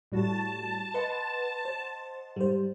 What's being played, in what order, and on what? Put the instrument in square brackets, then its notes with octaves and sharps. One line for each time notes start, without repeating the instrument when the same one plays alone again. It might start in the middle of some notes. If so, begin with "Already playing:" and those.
[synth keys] A2 G3 F#4 [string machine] A5
[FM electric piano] B4 [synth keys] D#5 F#5 C6
[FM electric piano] C5
[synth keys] G#2 [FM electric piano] G3 C5